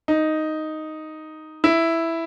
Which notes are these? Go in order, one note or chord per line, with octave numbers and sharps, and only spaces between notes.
D#4
E4